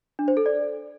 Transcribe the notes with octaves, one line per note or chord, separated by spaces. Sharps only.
D4
C5
A4
D5